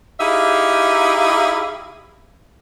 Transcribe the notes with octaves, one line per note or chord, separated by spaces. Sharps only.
D#4 E4 G4 G#4 E5 F5